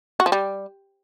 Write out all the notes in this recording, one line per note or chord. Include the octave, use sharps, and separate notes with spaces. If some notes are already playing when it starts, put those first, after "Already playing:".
F#4
F3
G3